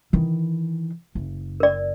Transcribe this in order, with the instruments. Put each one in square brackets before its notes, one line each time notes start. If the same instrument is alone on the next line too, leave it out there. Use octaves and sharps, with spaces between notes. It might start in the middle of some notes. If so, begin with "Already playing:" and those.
[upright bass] D#3 E3
F#1
[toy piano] A#4 D5